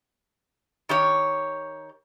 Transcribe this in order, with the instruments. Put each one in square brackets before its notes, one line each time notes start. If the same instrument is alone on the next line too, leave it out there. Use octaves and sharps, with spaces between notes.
[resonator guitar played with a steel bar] D#3 G4 C#5